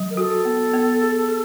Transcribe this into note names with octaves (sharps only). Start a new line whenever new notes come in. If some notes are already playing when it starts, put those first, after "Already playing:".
Already playing: F#3
A#4
F#4 A4
B3
B3
G#4
G#4